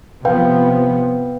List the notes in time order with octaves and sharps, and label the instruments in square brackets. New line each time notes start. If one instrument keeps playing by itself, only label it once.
[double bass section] C3 F3 B3 [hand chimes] B4 F5 G5